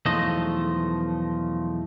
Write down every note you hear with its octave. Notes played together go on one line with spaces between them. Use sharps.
B1 E2 F3 A3 D#5